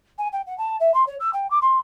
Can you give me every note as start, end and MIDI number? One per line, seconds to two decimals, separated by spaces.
0.18 0.28 80
0.32 0.41 79
0.47 0.57 78
0.58 0.76 81
0.80 0.93 76
0.94 1.06 84
1.07 1.16 73
1.20 1.31 88
1.33 1.49 79
1.50 1.59 86
1.62 1.78 84